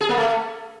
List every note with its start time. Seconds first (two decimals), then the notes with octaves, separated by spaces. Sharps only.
0.01 G#4
0.09 A#3
0.17 A3